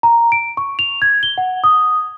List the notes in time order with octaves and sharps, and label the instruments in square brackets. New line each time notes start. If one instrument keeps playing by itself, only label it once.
[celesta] A#5
D7
C#6
F7
G#6
G7
F#5
D#6